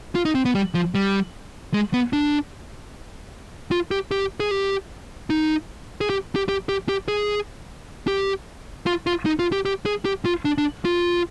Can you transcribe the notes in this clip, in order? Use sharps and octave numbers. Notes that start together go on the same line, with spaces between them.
F4
D#4
C4
B3
G3
F3
G3
G#3
B3
D4
F4
G4
G4
G#4
G4
D#4
G#4
G4
G4
G4
G4
G4
G#4
G4
F4
F4
D#4
F4
G4
G4
G#4
G4
F4
D4
D4
F4